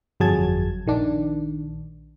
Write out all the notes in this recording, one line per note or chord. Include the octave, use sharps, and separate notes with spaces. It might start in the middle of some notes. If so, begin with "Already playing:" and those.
G1 F2 F#3 G#4 A5 G#6
A#1 D#3 D4